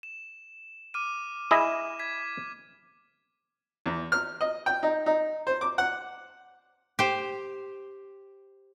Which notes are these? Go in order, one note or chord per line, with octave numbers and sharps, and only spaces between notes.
E7
D6 F6 D#7
E4 G#4 D#5 D#7 E7
G#6 B6
E2
F6
D#5
G5
D#4
D#4
C5
D6
F#5
G4 C5